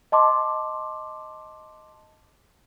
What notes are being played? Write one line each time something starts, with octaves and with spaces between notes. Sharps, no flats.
D#5 A5 C6 D6